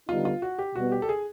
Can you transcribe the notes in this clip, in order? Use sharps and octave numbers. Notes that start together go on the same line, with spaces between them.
D3 G3 B3 D#4 F4
F4
F#4
G4
B2 G3 B3 F#4
G4
A4
G#4